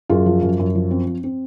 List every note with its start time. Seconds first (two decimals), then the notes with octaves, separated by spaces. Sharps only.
0.09 F#2 F4 G#4
0.26 F3
0.42 F#2
0.59 F#2
0.75 F3
0.91 C4
1.07 C4
1.24 C4